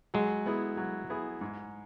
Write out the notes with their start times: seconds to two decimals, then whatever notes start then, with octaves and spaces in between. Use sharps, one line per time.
0.14 F#3 G#3
0.46 B3 E4 G#4
0.77 F#3
1.10 B3 E4 G#4
1.41 G#2